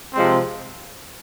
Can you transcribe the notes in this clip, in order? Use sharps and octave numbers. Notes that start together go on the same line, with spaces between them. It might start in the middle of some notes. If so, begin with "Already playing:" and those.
C3 F3 G#3 C4